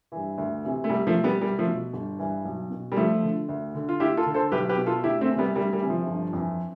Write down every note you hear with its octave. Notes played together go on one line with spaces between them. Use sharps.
G2 E3
D2
C3 E3
A3
C2 G3
F3 A3
B2
G3 B3
C2 G3
F3 A3
B2
G1
G2 E3
B1
B2
G3
D2 F3 A3
D3
D2
D3
F4
D2 E4 G4
F4 A4
D3
A4 C5
B1 G4 B4
G4 B4
B2
F4 A4
D2 E4 G4
A3 C4
C3 E3
G3 B3
D2 G3
G3
C3 E3
F3
G1
F2 E3